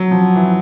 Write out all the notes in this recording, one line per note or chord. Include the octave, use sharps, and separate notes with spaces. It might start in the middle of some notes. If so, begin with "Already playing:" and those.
Already playing: F#3
F3
E3